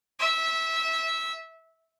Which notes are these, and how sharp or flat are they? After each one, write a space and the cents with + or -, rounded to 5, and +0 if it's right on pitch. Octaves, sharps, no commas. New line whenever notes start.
E5 -15